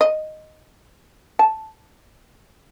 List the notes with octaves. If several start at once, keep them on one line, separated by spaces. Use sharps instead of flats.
D#5
A5